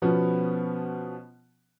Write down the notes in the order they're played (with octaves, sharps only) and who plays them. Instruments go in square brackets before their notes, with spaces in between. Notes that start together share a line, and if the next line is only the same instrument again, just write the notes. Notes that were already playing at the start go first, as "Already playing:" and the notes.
[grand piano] B2 F3 B3 C#4